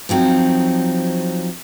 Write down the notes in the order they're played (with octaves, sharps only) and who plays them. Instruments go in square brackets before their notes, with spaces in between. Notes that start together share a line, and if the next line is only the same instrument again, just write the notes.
[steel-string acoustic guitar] F3 F#3 C4 D#4